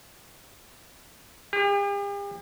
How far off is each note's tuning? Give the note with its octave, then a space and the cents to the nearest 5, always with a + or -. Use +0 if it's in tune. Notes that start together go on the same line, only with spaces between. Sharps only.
G4 +45